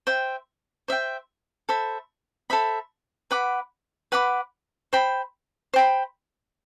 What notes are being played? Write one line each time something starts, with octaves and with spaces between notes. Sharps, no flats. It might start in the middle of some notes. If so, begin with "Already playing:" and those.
C5 E5 G5
C5 E5 G5
A4 C5 E5 B5
A4 C5 E5 B5
B4 F#5 B5 D6
B4 F#5 B5 D6
C5 G5 B5
C5 G5 B5